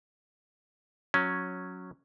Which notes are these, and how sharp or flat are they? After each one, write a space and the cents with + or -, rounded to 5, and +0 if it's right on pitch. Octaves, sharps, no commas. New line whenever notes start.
F#3 -10 C#4 +0